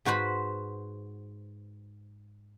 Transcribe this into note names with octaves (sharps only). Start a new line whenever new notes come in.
G#2 F#4 B4 C5 B5